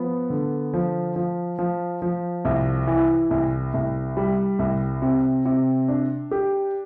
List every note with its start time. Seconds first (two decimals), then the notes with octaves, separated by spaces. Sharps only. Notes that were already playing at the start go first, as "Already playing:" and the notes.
Already playing: F3 B3
0.30 D3
0.74 F3
1.16 F3
1.59 F3
2.02 F3
2.45 C2
2.87 E3
3.31 C2
3.74 C2
4.17 G3
4.59 C2
5.02 C3
5.45 C3
5.88 D4
6.31 G4